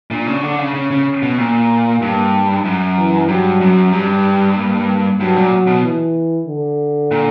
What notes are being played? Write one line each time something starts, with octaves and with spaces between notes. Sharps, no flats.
A#2 D4
C#3
D3
C#3
C#3 C#4
C#3
B2
A#2 A#3
G2
F#2
E3
G2 F#3
F#2
G2 G3
A#3
G2 F#3
A#2
B2
E3
D3
A#2